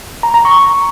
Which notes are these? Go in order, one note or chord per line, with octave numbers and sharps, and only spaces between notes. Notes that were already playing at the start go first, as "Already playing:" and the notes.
A#5
A#5
C#6